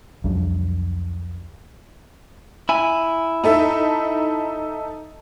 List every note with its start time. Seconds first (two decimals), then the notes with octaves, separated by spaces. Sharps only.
0.24 C2 F2 F#3 D4
2.69 E4 G#5
3.44 D#4 A4 E5